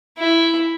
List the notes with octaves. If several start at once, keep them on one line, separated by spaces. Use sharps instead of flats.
E4